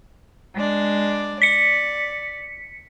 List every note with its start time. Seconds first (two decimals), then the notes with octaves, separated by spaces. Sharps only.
0.55 G#3 D4 D5
1.42 D5 B6 C#7